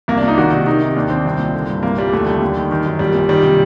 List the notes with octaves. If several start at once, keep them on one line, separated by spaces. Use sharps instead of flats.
C2 A#3
D4
A#2 D#4
D#3 F#4
C3
D#3 D#4
C3
D#2 D4
D#3 C4
C2
A#2
D3
G2
C2 A#3
A#2 G3
D#2 A3
D3 G3
D#2
D#3
D#3
F#2
A#1 G3
A#2
D#3 G3
C3